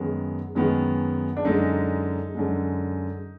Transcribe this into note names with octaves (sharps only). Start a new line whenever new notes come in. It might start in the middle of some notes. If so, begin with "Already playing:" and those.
Already playing: F#2 D#3 G#3 B3
F#2 D#3 G#3 B3
D4
F#2 D3 G#3 D#4
F#2 D3 G#3